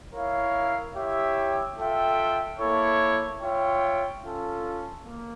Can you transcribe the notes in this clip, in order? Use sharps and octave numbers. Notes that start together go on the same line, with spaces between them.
E4 A#4 C#5 F5
E4 G4 C#5 E5
F4 A4 E5 G5
A#3 E4 A4 C#5
F4 C#5 E5 G5
C#4 F4 A4
A#3